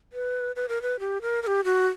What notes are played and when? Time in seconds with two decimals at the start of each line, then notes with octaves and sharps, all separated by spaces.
0.13 B4
0.56 B4
0.69 A#4
0.82 B4
0.99 G4
1.22 A#4
1.43 A#4
1.47 G4
1.64 F#4